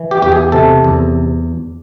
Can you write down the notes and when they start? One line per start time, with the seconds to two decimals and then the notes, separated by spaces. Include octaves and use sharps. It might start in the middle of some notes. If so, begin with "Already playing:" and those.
Already playing: E3
0.11 G4
0.22 E2 G4
0.32 G#4
0.52 C3 A4
0.84 E2